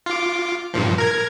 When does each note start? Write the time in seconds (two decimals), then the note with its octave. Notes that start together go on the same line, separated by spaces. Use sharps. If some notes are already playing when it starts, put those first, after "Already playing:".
0.06 F4 D6
0.74 G2 A#2 F3
0.98 A#4 G#6